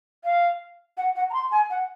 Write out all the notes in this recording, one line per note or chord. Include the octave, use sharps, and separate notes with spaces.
F5
F#5
F#5
A#5
C6
G#5
F#5